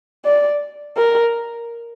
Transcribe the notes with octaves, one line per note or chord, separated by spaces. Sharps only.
D5
A#4